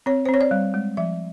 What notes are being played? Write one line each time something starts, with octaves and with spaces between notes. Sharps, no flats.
C4 C#5
C5
C4
C#5
D5
G3
G#3
F3 E5